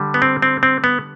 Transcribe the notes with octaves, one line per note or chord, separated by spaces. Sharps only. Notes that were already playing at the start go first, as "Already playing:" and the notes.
Already playing: D3 G3
B3
C4
C4
C4
B3